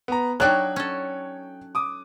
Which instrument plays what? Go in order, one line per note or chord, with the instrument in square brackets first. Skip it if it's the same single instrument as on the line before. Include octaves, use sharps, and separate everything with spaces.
[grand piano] B3 A#5
[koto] F#3 D4 D#4 [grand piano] C#5 [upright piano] G5 F#6
[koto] C#4 A4
[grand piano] D6 D#6